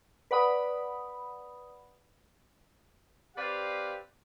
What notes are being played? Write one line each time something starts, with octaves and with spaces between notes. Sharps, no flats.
B4 D5 F#5 B5 D#6
C4 G4 B4 D5 F5